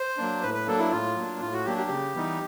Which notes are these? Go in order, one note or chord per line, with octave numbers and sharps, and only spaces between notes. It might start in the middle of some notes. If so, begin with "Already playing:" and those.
Already playing: C5
F#3 A#3 D4
A2 B4
B4
F#3 A#3 D4 A4
E4
A2 F4
F#3 A#3 D4
A2 F4
F#4
F#3 A#3 D4 G4
G4
C#3
E3 G3 B3 D#4